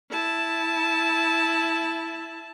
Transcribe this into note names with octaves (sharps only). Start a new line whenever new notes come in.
E4 A5